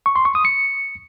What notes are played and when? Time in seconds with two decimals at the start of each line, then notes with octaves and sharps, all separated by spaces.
0.06 C#6
0.16 C6
0.25 C#6
0.35 D#6
0.45 C#7